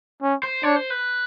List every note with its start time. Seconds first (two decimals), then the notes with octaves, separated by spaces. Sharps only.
0.23 C#4
0.43 C5
0.63 D4 C#5
0.76 C5
0.90 B4